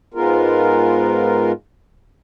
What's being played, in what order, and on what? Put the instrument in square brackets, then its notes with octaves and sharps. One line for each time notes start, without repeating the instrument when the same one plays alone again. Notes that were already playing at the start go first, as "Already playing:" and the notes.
[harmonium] G#2 G#3 B3 F4 A#4